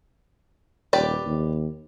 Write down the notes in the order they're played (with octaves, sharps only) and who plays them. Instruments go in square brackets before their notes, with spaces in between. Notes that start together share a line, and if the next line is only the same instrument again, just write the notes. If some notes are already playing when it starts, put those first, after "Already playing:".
[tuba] D#1 [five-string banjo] G4 B4 D5
[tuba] D#2